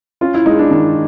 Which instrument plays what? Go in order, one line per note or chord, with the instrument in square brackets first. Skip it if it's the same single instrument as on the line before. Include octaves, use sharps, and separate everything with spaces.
[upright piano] C#4 [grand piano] F4
[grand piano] E4
[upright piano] G#3 [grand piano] D#4
[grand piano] D4
[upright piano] D#3